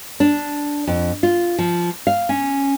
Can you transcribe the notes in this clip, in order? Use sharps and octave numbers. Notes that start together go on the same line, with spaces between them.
D4
F2
F4
F3
F5
C#4